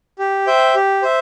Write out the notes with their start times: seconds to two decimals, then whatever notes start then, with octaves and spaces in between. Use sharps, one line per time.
0.19 G4
0.47 C5 E5 G5
0.75 G4
1.03 C5 E5